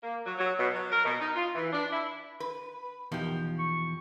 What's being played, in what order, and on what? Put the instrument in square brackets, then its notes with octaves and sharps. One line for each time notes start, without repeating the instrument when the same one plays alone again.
[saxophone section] A#3
F#3
F#3
B2
F#3
A#4
B2
D#4
F4
E3
D4
E4
[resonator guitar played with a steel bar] B4
[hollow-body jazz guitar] E2 B2 D#3 [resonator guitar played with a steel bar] F3 G4
[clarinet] C#6